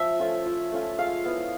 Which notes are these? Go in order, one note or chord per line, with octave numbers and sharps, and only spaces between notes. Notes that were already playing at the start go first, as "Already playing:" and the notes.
Already playing: F3 E5
A3 C#4 F4
F3
A3 C#4 F4
G#3 F5
B3 E4